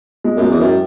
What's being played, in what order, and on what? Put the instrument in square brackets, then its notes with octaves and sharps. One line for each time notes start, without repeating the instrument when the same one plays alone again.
[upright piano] G#3
[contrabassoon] F#2
[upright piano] G#3
[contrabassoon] E2
[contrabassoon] F#2 [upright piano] A2